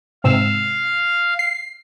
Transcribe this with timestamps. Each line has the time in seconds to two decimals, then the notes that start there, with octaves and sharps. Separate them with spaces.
0.24 G#2 C3 F5 E6
1.39 C7